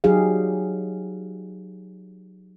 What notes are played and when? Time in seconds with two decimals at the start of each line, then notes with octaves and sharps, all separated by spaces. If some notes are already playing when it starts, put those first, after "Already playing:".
0.04 F#3 D#4 G4 G#4 F5